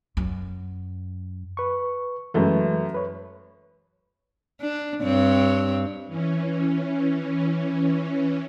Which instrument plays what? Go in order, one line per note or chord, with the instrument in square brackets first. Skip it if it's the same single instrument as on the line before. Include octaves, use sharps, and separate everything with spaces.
[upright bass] F#2
[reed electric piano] B4 C#6
[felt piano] F#2 A3 [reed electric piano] E3 G#3 B4
[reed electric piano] B4 C#5
[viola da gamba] D4
G2 C4 C#5
[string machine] E3 C#4